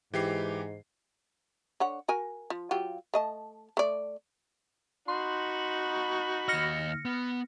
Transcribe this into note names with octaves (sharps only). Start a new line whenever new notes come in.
G#2 E3 G4 C7
D3 C#5 F#5
F#4 A#4 G#5
F3
F#3 F4 G4
A3 D#5 A5
A3 D5
D#4 F#4 B5 C6
D#2 D#5 F6 A#6 C#7
B3